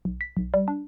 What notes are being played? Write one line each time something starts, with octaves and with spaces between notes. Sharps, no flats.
B1
B6
B1
G3
D4